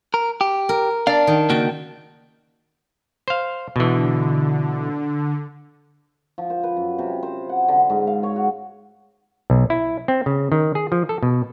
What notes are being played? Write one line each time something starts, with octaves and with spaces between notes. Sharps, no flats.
A#4
G4
A#4
D4 D5 F5
D#3
C#3 A#3 F#4 G5 A5
C5 F5
B2 D3 E3
F3
C5
B4
F#2
C3
C5
F#5
D3
G#2
F5
C#5
F#4
B1
E4
C4
C#3
D#3
G#4
F3
A4
B2